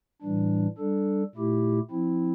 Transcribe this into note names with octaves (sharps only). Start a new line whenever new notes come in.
A2 E3 G3 D4
G3 D4 A4
A#2 A3 E4 G4
F3 C4 E4